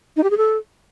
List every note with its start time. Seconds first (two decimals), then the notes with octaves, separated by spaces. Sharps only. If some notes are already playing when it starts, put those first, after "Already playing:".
0.17 D#4
0.24 G4
0.30 G#4
0.37 A4